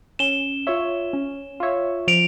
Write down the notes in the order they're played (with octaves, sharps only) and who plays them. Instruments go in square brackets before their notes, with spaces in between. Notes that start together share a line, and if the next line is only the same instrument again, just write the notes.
[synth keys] C#4 [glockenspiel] E7 G7
[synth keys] F4 C#5 E5
C#4
F4 C#5 E5
[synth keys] F3 [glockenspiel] D7 F7